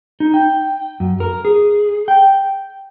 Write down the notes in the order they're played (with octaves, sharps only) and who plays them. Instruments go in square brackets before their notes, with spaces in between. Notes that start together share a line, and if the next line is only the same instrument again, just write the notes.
[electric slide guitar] D#4
G5
F#2
A#4
G#4
G5